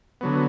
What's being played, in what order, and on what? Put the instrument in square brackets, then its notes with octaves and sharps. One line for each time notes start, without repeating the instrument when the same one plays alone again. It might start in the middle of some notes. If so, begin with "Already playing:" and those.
[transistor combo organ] D3 F#3 B3